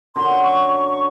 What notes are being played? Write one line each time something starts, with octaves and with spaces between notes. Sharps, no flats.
F#2 D3 F#3 C6
C#6
C#6
C#6